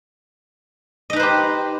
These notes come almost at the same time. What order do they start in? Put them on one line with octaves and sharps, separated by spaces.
D#5 D#4 B4 C5 G4